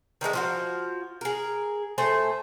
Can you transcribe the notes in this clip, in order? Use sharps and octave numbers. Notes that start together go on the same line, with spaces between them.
D#3 E3 G#3 A3
F3 F4 F#4
G#4 A#4
A3 C5 E5 G#5